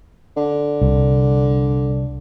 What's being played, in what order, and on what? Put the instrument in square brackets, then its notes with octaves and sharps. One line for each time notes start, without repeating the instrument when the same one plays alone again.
[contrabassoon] D3
[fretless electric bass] C2